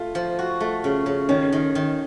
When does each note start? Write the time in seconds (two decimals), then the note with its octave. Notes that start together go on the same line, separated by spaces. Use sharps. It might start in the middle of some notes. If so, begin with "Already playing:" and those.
Already playing: A3 F4
0.15 F3
0.39 F#4
0.60 A3
0.84 C#3
1.06 C#3
1.29 D#3 C#4
1.52 D#3
1.75 D#3